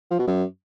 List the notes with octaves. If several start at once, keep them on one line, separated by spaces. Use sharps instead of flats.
F3
B2
F#2